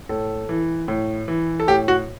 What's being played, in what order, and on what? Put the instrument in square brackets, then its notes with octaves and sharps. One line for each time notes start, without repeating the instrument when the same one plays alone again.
[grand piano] A2 A4
E3
A2
E3
A4
A2 G4
F#4